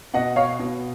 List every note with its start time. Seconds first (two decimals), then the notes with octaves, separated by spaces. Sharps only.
0.14 B2 D#5 F#5
0.36 C#5 F5
0.59 B2